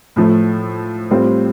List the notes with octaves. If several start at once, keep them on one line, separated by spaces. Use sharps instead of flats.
A2 F3 A3
A2 G3 C4 F4